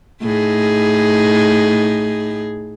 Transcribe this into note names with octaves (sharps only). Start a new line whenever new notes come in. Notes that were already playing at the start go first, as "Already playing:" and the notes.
A2 D#4 G#4